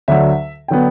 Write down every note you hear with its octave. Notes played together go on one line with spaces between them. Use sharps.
D2 D3 F#3 E5
D3 F#3 B3 G5